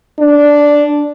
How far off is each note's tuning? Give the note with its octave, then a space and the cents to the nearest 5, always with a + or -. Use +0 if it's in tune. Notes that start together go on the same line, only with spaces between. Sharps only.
D4 -5